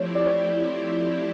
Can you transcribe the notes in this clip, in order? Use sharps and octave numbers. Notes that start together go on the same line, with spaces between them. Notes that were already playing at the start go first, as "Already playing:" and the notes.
Already playing: F3 A3 C4 E4 G4 C#5
D5
C#5